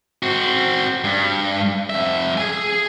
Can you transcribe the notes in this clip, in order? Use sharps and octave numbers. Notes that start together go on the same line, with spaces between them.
C4 F#4
G2
F2 E5
G#4 G#5